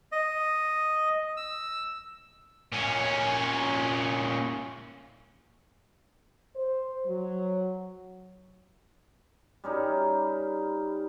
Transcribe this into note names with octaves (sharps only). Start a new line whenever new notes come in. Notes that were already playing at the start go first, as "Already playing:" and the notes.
D#5
E6
A#2 C#4
C5
F#3
G3 C#4 D#4 A#4